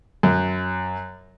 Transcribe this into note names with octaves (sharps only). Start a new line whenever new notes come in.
F#2